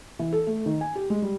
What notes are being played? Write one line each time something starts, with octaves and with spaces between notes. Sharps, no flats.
E3
A4
A3
D#3
G#5
G4
G#3
G3